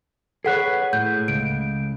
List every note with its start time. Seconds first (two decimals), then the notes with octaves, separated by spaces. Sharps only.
0.45 G#4 A4 B4 C#5 F#5 F#6
0.93 A2 G6
1.28 C#2 D7